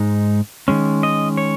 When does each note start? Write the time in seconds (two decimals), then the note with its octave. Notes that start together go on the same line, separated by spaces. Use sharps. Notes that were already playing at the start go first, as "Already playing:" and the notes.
Already playing: G#2 G#3 D#4
0.68 D#3 G#3 C#4
1.03 D#5
1.37 C#5